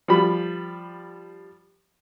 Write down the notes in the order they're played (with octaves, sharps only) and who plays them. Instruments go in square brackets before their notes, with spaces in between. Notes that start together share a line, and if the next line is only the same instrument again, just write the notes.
[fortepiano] F3 G3 B5